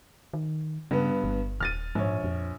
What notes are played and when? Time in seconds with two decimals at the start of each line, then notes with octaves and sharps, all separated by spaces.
0.33 D#3
0.91 G2 C#3 B3
1.24 G1
1.60 D#1 F6 A6 D#7
1.95 A#1 G#2 C#5
2.24 F2